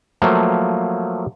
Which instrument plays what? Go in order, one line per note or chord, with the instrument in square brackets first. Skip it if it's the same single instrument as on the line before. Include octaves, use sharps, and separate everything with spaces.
[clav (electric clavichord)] F3 F#3 A3 A#3